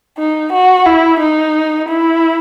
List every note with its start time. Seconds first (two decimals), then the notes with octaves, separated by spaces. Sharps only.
0.18 D#4
0.53 F#4
0.86 E4
1.20 D#4
1.89 E4